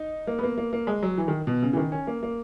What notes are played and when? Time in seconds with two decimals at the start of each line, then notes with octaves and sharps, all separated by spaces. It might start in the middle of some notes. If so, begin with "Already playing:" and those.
Already playing: D#4
0.27 A#3
0.39 B3
0.43 A#3
0.58 A#3
0.73 A#3
0.87 G#3
1.02 F#3
1.18 E3
1.28 D#3
1.47 B2
1.62 C#3
1.73 E3
1.77 D#3
1.92 C#4
2.07 A#3
2.23 A#3